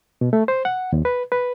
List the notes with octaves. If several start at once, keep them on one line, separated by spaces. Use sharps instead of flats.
B2
A3
C5
F#5
D#2
B4
B4